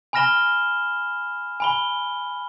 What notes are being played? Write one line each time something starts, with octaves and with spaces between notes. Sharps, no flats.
G#5 B5 F6 A#6 E7 G7
G#5 B5 G7